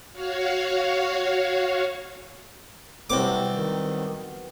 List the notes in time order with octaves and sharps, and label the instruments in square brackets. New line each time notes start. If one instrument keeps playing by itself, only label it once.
[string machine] F#4 C#5 F5
[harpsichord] C2 D6 [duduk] C3 [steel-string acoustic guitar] F#3 B3 C4
[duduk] D#3